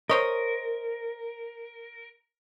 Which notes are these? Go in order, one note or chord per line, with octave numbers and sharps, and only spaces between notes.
A#4 C5 C#5 D#5